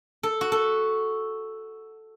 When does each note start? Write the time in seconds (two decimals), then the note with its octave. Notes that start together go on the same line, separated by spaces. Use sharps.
0.23 A4
0.41 F#4
0.52 A4